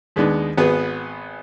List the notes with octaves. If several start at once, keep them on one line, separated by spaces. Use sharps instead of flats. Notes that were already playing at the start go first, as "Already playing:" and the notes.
D#2 G#3 B3 D4 D#4
G#1 B3 G#4 B4